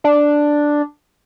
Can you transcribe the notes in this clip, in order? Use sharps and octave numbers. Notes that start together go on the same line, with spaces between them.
D4